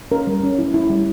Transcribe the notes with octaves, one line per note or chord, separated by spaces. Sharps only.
C#4 A#4
G3
C#4
E4
E4
G3